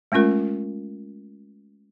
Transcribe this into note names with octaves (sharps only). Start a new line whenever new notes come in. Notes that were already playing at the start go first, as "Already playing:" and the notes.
G#3 A3 C#4 F4 A#4